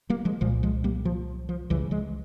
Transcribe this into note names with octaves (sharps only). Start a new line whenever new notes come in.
G3 A#3
F3 G#3
C2 A#2 F3 G#3
F3 G#3
G3 A#3
F3
F3
C#2 C#3 E3 G3
F3 G#3